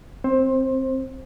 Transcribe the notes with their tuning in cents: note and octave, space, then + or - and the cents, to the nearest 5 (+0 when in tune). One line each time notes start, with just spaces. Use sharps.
C4 +0 C5 +20